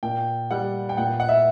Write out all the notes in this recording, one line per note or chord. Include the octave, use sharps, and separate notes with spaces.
A#2 G5
G3 F#5
G5
A#2 F#5
F#5
E5